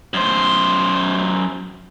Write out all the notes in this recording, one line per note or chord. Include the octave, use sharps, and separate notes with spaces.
F#2 C5